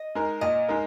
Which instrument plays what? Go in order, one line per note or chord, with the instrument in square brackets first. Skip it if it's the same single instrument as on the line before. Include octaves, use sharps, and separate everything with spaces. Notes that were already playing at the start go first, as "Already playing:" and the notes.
Already playing: [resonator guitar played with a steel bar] D#5
[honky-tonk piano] G#3 D#4 A#4
[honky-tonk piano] A#2 [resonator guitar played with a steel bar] D#5
[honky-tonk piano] G#3 D#4 A#4